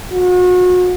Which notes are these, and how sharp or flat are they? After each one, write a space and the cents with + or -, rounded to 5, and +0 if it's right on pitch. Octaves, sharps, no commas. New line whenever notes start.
F#4 -35